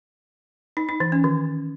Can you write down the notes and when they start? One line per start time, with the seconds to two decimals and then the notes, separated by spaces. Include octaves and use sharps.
0.77 D#4
0.89 D#4
1.00 E3
1.12 C#4
1.24 D#3